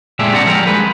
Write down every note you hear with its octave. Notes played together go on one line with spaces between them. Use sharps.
A#2 D3 G#3 D4 G4 E5
C4 G4 D5 F#5 A#5
F3 G3 A#4
G#3 B4